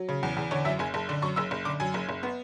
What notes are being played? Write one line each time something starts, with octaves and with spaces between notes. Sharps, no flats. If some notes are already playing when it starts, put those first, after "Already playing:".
Already playing: F#3
C#3
E2
E2
D3 C#5
F#2 E5
F#1 G#5
F#1 A5
D3
F#2 C#6
F#1 E6
F#1
D3 D6
F#2 G#5
F#1
F#1
B3